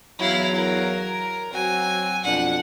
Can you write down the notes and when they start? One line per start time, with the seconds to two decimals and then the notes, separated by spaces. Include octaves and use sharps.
0.19 E2 F#3 E4 F5
0.55 A#4
1.53 F#3 C4 F#4 G#5
2.25 F2 B2 D4 F#5